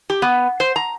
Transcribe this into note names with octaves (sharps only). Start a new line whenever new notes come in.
G4
B3
C5
A#5